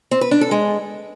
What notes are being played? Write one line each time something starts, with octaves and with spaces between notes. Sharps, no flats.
C4
B4
D4
A4
G#3